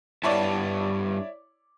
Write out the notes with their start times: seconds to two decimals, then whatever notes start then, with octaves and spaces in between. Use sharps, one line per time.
0.23 G2 B3 E4 C#5 D5 A5